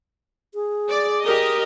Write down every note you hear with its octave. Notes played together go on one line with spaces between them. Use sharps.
G#4
D5
G4 A#4 D#5